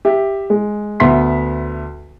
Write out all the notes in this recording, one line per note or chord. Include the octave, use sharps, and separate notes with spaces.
G4 E5
G#3
D2 B3 B4 E5 C6 B6